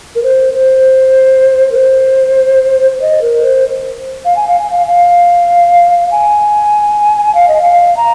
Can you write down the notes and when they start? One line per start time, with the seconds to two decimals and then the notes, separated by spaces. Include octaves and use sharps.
0.15 A#4
0.23 C5
0.54 C5
1.72 A#4
1.77 C5
3.01 D#5
3.21 A#4
3.42 C5
4.25 F5
4.36 G#5
4.47 F5
4.59 G#5
4.70 F5
4.87 F5
6.11 G#5
7.35 F5
7.48 D#5
7.61 F5
7.97 A#5